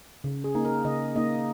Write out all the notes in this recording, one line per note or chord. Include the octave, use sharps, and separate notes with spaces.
C#3
G#4
A#3 D#4
A#4
C#3 D#5
A#3 D#4 D#5